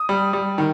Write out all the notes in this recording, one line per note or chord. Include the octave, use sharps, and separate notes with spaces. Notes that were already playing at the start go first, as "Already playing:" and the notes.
Already playing: D#6
G3
G3
D#3